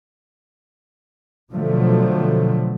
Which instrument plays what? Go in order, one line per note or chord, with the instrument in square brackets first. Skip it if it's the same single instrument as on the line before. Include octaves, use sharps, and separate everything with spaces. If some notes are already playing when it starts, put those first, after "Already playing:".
[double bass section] B2 D3 F3 F#3 A3